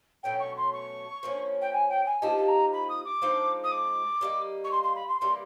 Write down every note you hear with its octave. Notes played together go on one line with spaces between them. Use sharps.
B2 F#3 A3 C#4 G5
C#6
C6
C#6
F3 A#3 C#4
G5
G#5
G5
G#5
F3 A#3 D#4 G4 A5
A5
A#5
B5
D#6
D6
F3 G#3 C4 D#4
D#6
D6
G3 A#3 D#4
C#6
C6
C6
B5
C6
E3 G3 A#3 C6